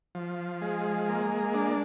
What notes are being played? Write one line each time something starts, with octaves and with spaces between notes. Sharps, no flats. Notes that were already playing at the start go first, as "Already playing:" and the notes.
F3
G#3
A#3
D4